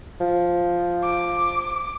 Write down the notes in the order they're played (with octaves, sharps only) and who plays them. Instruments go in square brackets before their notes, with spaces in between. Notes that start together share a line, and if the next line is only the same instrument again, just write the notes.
[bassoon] F3
[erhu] D6